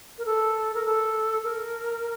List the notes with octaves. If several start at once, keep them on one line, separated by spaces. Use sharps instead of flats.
A#4
A4
A#4
A4
A#4